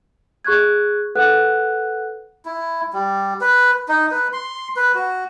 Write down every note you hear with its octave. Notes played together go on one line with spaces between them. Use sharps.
G#4 C#6 F#6 G#6
A4 B4 F#5 F#6
E4
G3
B4
D#4
B4
C6
B4
F#4